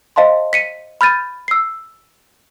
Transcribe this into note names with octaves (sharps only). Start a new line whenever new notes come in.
C5 D#5 F5 A5 C6
B6 C#7 D#7
B5 F6 G6 A6 D#7
E6 C7